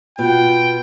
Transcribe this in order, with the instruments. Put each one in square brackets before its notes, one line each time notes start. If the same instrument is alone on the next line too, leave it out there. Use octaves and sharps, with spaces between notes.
[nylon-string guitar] B2 [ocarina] F4 [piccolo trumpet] G5